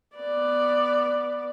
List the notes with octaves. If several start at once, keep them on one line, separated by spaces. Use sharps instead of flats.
B3 D5